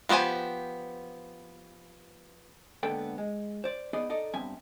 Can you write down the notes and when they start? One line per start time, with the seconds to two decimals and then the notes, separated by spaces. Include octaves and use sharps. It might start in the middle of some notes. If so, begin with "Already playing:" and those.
0.09 F3 B3 G4 C5 G#5
2.83 G#2 D3 A#3 B3 A4 G5
3.18 G#3
3.64 C5 D5
3.93 B3 D#4 G#4 D5 D#5
4.10 D#4 A4 D5 D#5
4.34 G2 B3 C4 E5 G#5